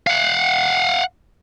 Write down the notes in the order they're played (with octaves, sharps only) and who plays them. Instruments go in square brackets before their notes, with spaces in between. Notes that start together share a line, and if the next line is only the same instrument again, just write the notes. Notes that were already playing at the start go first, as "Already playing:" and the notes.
[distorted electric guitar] F5 F#5